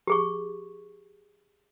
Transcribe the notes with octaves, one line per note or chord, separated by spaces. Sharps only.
G4 G#4 C#6